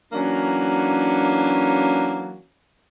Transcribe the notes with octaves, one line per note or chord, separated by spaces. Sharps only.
E3 F#3 A#3 C#4 D4